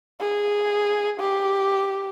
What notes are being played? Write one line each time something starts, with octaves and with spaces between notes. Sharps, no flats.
G#4
G4